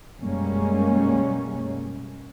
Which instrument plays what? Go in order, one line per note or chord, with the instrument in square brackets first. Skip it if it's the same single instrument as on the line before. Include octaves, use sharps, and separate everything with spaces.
[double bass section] F#2 B2 G3 G#3 A#3 C#4